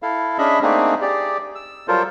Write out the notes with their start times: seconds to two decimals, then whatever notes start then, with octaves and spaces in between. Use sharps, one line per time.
0.02 E4 A4 F5
0.38 C#4 D4 G#4 D#5 E5 B5
0.62 A3 A#3 C4 D4 D#4 G#4
1.02 G4 G#4 D5
1.55 E6
1.88 F#3 G3 F4 A4 A#4 C5